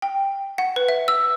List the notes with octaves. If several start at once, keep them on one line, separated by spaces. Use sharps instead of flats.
G5
F#5
B4
E5
E6